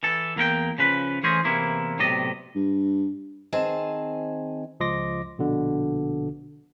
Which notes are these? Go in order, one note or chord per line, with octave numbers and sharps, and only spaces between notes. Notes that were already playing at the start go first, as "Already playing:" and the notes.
E3 A4
E2 A#3 A#4 G5
C#3 F3 B4
E3 A3 C#4 G#4 C5 D#5
E2 C3 E3 A#3 E4
B1 A2 C3 D5 D#5
G2
D#3 C4 G#4 G#5 A5
C#2 F3 D#5 C6 D6 A#6
A#1 B2 D3